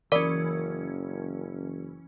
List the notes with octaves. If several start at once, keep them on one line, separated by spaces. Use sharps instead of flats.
F#1 E3 C#4 A#4 D5